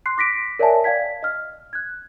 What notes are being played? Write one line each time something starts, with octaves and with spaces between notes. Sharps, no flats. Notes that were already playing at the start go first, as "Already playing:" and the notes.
C6 F#6 C7
D6 A#6 B6 D7
A#4 C#5 D5 E5 G#5 A5
D5 F5 G5 G#6 B6
D#5 F6
F#6 G#6